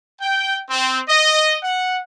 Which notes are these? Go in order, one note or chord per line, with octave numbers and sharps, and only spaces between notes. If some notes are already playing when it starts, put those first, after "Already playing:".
G5
C4
D#5
F#5